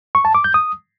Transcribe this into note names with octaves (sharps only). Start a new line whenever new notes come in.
C#6
A5
D6
G6
D#6